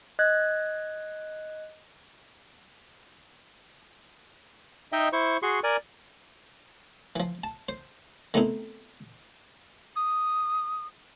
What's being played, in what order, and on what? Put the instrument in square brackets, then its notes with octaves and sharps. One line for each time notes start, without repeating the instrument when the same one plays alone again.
[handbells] D#5 F#6 G#6
[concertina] D#4 D#5 E5 G5
E4 C5 C#6
F#4 G#4 C6 C#6
A#4 D5 G#5
[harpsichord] E3 F3
A5
C5
D#3 A3 B3 C4 D#4 E4
[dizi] D#6